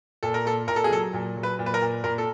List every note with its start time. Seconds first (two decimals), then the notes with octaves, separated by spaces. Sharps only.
0.23 A#2 A4
0.34 A#4
0.45 A#2 A4
0.68 A#2 A#4
0.76 A4
0.84 G#4
0.90 F#3 A4
1.13 A#2
1.36 F#3
1.43 B4
1.59 A#2
1.66 B4
1.74 A#4
1.81 A#2
2.04 A#2 A#4
2.18 A4